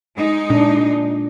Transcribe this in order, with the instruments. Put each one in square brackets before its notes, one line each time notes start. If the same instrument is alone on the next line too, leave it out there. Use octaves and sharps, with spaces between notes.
[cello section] G#3 D#4
[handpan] A#2 D4